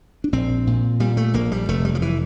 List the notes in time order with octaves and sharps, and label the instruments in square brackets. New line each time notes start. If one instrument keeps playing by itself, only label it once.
[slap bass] D4
A#1 C4
A#2
A#2 G3
A3
A#1 A#3
G3
F1 A3
G3
F3
E3